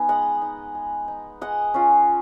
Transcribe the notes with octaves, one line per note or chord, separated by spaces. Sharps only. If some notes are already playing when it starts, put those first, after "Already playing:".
Already playing: B3 D#4 G#5
G#3 D#5 F#5
D#4
G#3
D#4
G#3 D#5 F#5
C#4 F4